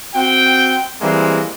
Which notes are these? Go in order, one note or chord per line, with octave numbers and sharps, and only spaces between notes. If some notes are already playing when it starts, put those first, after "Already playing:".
C4 F#4 G5
E3 G3 G#3 A#3 C4